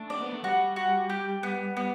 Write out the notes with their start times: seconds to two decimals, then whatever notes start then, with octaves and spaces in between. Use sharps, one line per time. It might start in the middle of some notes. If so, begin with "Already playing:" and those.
Already playing: A3 D4
0.09 C4 D5
0.21 B3
0.32 A3
0.44 G3 F#4
0.76 F#4
1.10 G4
1.43 B3
1.77 B3